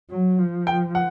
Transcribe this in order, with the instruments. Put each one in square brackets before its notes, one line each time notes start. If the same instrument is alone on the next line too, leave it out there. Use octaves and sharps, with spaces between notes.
[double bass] F#3
F3
[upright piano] G5
F#5